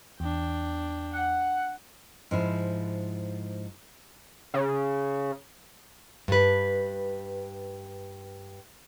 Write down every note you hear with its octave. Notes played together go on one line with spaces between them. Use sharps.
E2 D4 G5
F#5
G#2 F3 E4
C#3
G2 B4